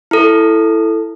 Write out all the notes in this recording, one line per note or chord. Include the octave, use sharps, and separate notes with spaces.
E4 A4